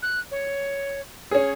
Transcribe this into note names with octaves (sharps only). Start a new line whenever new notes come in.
F#6
C#5
C#4 G#4 C#5